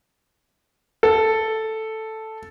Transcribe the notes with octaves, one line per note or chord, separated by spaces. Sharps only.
A4